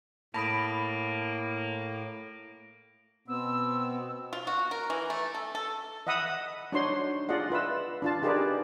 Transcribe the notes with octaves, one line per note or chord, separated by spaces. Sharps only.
A2 A#3 A5 B5 D#6 A#6 D7
B2 B3 C4 E6
F4
F#4
A#4
E3
A3
A4
A4
D#5 E5 F#5 B5 D#6 E6
D4 D#4 F#4 C5 C#5 C6
F4 G#4 D5 D#5 F#5
F4 B4 E5 E6
D4 F4 A5
D#4 G4 G#4 A#4 B4 D5